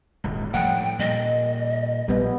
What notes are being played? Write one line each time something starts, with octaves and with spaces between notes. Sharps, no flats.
D#1 G#1 C#2
A2 F3 G3 F#5 G5
A#2 G3 D#5
A#1 G3 B3